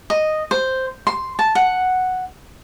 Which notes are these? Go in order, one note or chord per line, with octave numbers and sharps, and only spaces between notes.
D#5
C5
C6
A5
F#5